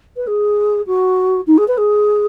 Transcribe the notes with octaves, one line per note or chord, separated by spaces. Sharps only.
B4
G#4
F#4
D#4
G#4
B4
G#4